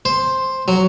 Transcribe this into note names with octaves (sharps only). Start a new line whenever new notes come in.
C5
F#3